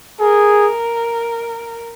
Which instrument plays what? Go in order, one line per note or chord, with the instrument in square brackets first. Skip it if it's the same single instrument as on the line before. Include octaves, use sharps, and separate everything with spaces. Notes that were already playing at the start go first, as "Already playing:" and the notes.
[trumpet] G#4 [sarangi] A#4